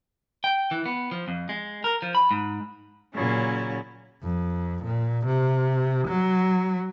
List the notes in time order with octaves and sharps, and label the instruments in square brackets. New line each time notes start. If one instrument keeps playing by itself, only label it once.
[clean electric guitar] G5
E3
B3
F3
F2
G#3
A#4
F3
B5
G#2
[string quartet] A#2 C#3 F#3 C#4 E4
[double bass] F2
A#2
C3
F#3